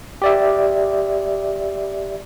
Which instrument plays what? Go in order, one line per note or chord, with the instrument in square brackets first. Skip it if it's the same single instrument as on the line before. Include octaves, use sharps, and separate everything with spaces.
[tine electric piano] G4 D5 E5